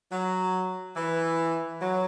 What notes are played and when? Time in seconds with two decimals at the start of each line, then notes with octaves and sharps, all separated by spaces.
0.12 F#3
0.97 E3
1.82 F#3